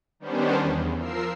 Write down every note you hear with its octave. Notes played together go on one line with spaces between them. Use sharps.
D#3 G3 B3 C#4 D4 C5
E2
F3 A#4 E6 C7